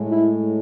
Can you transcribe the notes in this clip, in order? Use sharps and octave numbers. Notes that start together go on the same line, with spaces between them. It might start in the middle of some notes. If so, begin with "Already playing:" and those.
Already playing: A2 G#3
E4